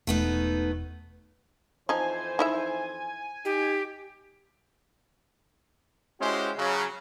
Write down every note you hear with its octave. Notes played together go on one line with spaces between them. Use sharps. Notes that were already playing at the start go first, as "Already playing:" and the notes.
E1 A3 B3 D#4
F2 E3 F3 D#4 C5 G#5
D#4 E4 E5
D#4 G4
G#3 C#4 E4 F#4 G4 C5
C#3 F#3